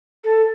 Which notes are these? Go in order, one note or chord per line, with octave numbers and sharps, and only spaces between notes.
A4